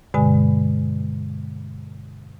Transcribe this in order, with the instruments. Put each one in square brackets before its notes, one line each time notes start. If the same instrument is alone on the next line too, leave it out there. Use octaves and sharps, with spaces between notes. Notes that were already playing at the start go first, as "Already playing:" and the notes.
[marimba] G2 B2 D3 G#3 G#5